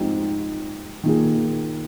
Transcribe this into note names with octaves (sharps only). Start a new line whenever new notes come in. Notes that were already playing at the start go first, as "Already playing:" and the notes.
Already playing: G#2 F3 C4 D#4 G4
D#3 A#3 F4 G#4